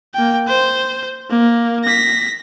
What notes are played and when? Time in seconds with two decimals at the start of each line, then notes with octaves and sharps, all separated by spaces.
0.14 A#3 G5
0.48 C5
1.30 A#3
1.84 A#6 B6